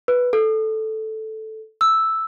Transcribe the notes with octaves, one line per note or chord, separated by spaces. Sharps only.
B4
A4
E6